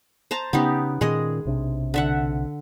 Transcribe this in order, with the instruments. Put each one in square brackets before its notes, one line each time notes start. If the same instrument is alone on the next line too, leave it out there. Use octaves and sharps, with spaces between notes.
[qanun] C5 A5 A#5
[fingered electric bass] C#3 C#4 [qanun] B3 D#4 G4
[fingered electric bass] A#2 D#3 C#4 [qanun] G#3 G#4 D#5
[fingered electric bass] B1 C3 D4
[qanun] D3 E5 F#5